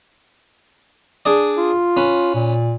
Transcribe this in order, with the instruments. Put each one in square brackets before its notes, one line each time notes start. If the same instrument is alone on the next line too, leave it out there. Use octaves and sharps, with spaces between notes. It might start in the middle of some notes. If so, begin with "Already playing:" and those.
[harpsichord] D4 G#4 D5
[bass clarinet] F4
[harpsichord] C#4 B4
[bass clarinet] A#2